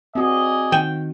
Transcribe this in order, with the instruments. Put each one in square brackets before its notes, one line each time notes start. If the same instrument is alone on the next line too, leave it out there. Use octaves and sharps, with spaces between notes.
[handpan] C4 F#4 [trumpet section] G#4 D5 D#5
[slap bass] D#3 [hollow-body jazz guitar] G5